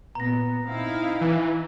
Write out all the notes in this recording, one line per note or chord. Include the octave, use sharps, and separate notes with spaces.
A#2 B3 A#5 A#6
C4 D#4 E4 F5
E3